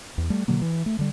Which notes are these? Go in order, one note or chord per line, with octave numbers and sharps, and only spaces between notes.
E2
G3 A3
B2 D3 F#3 A#3
E3
A3
D3 G3